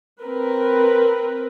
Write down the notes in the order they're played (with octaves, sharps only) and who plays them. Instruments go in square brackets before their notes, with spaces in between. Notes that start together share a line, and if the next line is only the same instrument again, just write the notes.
[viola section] C4 A#4 B4